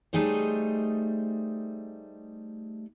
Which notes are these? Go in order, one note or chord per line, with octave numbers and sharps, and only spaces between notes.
G3 A3 D#4 G#4 C5 C#5